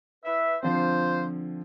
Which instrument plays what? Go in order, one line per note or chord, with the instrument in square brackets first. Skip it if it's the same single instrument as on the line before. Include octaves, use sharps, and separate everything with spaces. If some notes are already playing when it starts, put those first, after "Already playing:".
[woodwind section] E4 B4 E5
[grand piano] D3 F3 C4 [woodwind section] F4 C5